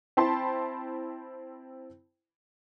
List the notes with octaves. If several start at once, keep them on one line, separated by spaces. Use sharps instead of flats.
C4 E4 G5 A5 B5 C6